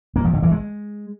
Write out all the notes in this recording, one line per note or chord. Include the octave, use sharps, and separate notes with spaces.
A#3
F3
D3
E3
G#3